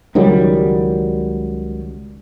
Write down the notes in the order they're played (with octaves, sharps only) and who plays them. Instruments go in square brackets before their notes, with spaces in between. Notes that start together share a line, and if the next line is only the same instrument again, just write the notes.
[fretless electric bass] C#2 D#3 F#3 G3